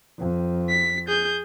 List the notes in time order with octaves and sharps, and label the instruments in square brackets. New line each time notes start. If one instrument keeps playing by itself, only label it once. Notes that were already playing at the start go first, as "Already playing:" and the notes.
[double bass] F2
[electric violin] B6
G#4 G6